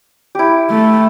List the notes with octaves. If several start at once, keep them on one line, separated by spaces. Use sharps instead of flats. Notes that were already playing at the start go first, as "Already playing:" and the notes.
E4 G4
A3